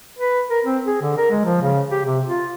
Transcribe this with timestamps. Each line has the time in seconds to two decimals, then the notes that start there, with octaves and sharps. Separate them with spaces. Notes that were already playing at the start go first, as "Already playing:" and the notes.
0.19 B4
0.50 A#4
0.65 C4
0.86 G#4
1.02 D3
1.18 A#4
1.31 G#3
1.45 F3
1.62 C#3
1.91 G4
2.05 C3
2.27 F4